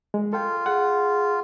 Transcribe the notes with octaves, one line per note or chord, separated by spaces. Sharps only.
G#3
F4 A4 G5
G#4 F#5